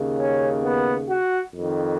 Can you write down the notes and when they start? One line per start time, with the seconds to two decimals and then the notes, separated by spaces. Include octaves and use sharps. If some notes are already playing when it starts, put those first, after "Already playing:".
Already playing: D#2 C#3
0.18 C#4
0.63 B3
1.09 F#4
1.54 F2 D#3